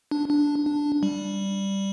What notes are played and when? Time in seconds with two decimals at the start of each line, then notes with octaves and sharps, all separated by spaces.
0.11 D4
0.30 D4
0.66 D4
1.03 G3